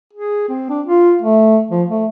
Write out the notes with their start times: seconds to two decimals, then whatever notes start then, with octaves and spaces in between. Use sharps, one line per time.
0.13 G#4
0.49 C4
0.69 D4
0.86 F4
1.22 A3
1.71 F3
1.89 A3